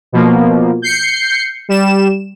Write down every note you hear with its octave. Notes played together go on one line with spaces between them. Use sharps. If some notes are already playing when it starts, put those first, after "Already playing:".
B2 F3 A#3
G6 C7 C#7
G3 E7